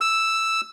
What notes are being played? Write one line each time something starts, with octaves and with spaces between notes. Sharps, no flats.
E6